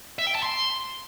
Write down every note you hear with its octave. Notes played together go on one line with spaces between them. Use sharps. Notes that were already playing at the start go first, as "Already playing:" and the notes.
E5
G5
A5
C6